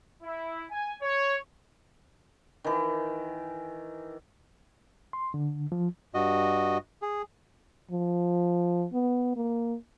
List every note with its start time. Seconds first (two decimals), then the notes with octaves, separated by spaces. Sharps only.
0.23 E4
0.71 G#5
1.02 C#5
2.64 D#3 E3
5.13 C6
5.34 D3
5.72 F3
6.14 G2 F#4 D#5
7.02 G#4
7.91 F3
8.93 B3
9.36 A#3